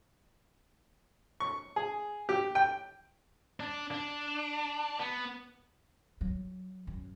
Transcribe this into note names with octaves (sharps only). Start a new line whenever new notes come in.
C#6
G#4
G4
G5
D4
D4
B3
F#3
F#2